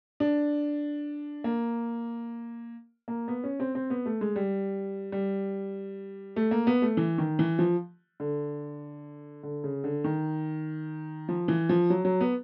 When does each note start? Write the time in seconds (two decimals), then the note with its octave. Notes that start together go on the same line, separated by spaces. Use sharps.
0.20 D4
1.44 A#3
3.08 A#3
3.28 B3
3.44 C#4
3.60 C4
3.75 C4
3.90 B3
4.06 A3
4.21 G#3
4.36 G3
5.12 G3
6.36 A3
6.51 A#3
6.67 B3
6.82 A3
6.97 E3
7.18 D#3
7.39 E3
7.59 F3
8.20 D3
9.43 D3
9.64 C#3
9.84 D3
10.04 D#3
11.29 F3
11.48 E3
11.69 F3
11.90 F#3
12.05 F#3
12.21 B3